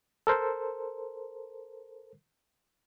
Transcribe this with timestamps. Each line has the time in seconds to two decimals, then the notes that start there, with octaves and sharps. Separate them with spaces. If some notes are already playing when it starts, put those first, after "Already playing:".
0.27 A4 A#4 C5